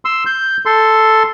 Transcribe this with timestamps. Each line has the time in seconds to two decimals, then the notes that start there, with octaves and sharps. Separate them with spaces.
0.05 C6 E6
0.26 G6
0.66 A4 C6